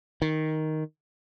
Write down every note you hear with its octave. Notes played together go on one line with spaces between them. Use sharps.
D#3